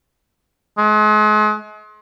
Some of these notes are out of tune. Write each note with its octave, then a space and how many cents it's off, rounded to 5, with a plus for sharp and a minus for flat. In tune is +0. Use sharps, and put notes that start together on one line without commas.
G#3 +40